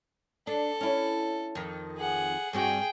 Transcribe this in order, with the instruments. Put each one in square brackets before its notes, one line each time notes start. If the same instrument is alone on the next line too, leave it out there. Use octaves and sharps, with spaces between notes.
[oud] D4 [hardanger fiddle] A4
[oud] C#4 E4
F2 D#3
[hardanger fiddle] G#4 F#5
[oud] G2 C4 F#4 [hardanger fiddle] G#4 G5